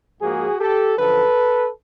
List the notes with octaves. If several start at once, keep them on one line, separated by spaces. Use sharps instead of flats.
G#2 F3 A#3 F#4 G#4
G4 A4
F#2 D3 F3 A4 B4